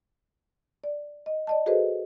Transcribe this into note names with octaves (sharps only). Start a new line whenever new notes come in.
D5
D#5
D5 D#5 A5
F#4 G#4 A4 B4 C5 D#5